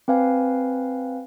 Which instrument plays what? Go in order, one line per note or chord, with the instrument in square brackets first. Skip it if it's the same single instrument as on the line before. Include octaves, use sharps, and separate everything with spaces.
[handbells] C4 B4 F5 G#5